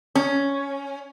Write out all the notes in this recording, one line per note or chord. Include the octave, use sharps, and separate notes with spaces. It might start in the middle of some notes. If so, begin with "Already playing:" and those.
C#4